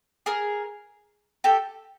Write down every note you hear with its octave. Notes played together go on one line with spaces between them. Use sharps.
G#4 A#4
G4 A4